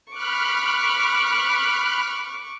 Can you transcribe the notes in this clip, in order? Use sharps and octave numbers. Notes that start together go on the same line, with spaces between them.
B5 C#6 D6 F6 F#6